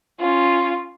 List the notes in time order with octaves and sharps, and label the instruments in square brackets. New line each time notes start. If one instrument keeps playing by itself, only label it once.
[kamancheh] C#4 F4